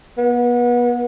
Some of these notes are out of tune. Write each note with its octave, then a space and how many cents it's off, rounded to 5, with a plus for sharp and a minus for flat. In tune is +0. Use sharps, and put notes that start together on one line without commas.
B3 -30